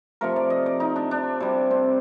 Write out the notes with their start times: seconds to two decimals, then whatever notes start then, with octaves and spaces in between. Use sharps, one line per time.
0.21 C3 F3 A3 A#4
0.36 D5
0.50 D#5
0.66 D5
0.80 D#4
0.96 D4
1.11 D4
1.40 C3 G3
1.71 C4